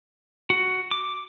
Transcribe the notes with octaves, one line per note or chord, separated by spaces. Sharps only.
F#4
D6